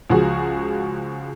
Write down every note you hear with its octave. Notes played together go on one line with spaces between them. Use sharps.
C#2 F3 F#4 G#4